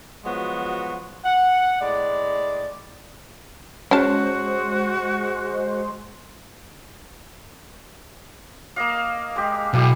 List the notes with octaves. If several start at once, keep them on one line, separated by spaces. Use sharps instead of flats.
F3 F#3 G#3 B3 F#4
F#5
A2 G#3 D5
G#3 C#4 F#4 C5 A5
A#3 D#5 F5
G#3 G4
B1 B2 E3 G4